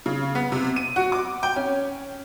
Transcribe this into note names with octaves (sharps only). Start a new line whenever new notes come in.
C#3
B3
C3
D#7
F#4
D6
G5
C#4